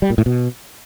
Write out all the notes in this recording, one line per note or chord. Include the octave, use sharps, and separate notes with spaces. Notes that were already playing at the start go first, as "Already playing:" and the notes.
G3
A#2
A2
B2